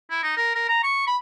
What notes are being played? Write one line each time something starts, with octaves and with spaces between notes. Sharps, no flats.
E4
D#4
A#4
A#4
A#5
C#6
B5